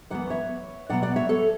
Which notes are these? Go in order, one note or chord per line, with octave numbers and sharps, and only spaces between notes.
F#2 E3 B3 D5 F#5
C#5 E5
B2 F#3 B3 D5 F#5
D5 F#5
C#5 E5
A4 C#5